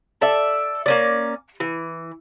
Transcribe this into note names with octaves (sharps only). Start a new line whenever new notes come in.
A4 D5 E5
A#3 C#4 D5
E3